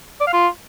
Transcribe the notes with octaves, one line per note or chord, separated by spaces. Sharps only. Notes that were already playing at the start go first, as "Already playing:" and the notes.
D5
F5
F4